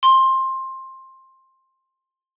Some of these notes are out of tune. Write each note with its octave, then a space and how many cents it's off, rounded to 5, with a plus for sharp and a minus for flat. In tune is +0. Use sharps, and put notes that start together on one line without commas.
C6 +15